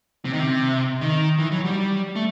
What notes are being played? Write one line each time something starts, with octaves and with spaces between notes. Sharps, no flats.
C3
D#3
C3
D#3
E3
F#3
G3
A3